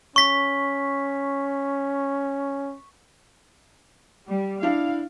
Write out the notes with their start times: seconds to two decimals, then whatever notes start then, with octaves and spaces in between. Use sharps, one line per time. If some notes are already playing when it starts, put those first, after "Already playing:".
0.16 C#4 C#6 B6
4.27 G3
4.63 D4 E4 F5